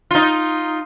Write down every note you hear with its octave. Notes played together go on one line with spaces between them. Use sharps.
D#4 F4